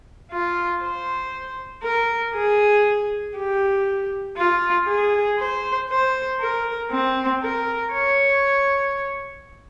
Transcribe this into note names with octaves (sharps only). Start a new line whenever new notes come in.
F4
C5
A#4
G#4
G4
F4
G#4
C5
C5
A#4
C4
A#4
C#5